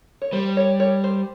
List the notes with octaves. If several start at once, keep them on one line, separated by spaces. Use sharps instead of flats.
C#5
G3 C5
C#5
C#5
C5